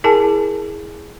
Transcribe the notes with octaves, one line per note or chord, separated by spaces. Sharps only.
E4 G#4 A#4 G#5 A5